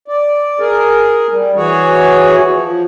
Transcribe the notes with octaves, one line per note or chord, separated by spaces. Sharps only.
D5
G#4 A#4
G3
E3 F#4 G#4 C#5
F3